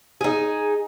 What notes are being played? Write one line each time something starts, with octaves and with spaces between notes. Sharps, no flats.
D#4 G#4